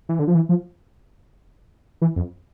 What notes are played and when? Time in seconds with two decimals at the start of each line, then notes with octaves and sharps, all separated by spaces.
0.09 E3
0.19 D3
0.27 F3
0.35 E3
0.49 F3
2.02 E3
2.16 F2